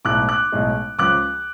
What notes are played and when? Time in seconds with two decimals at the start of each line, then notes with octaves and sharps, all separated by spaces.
0.05 B1 A2 G#3 D6 F#6
0.29 D6 F#6
0.52 B1 A2 G#3
0.99 C#2 C#3 F3 D6 F#6